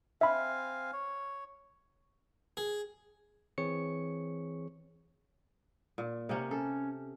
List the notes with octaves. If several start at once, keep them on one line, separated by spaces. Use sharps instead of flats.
C4 E5 F5 G#5 B5
C#5
G#4
E3 C4 G#4 C#5 C#6 C#7
A#2
C3 A#3 C#4
C#4 A4